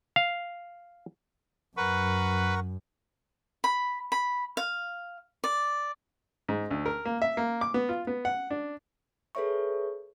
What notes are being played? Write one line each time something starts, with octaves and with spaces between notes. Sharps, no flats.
F5
F#2 A#4 B4 F#5 C#6
B5
B5
F5
D5
G#2
D2
A#4
A#3
E5
A#3
D6
B3
F4
B3
F#5
D4
G#4 A4 B4 C#5 E5 C#6